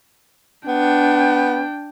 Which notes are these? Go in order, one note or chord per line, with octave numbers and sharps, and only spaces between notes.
B3 D4 G5